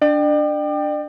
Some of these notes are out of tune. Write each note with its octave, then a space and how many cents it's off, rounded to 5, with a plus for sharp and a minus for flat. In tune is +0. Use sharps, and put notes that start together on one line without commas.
D4 -5 D5 +40 G5 +0